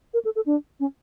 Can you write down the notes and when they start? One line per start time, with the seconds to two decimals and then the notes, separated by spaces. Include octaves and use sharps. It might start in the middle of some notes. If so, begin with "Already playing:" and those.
0.14 A#4
0.25 A4
0.36 A4
0.46 D4
0.80 C#4